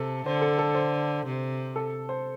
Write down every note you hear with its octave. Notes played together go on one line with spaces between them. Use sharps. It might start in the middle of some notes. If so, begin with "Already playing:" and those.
Already playing: C3 A4
D3 C5
A4
A4
C5
C3
A4
C5